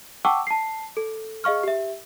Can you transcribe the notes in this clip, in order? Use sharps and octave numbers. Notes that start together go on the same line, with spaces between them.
F#5 G5 A5 C#6 D6 E6
A5 C7
A4
G#4 D#5 F5 C#6 F6
G4 E5